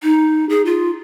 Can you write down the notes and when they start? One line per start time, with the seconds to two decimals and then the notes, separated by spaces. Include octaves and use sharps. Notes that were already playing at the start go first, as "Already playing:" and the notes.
0.03 D#4
0.49 G#4
0.65 F4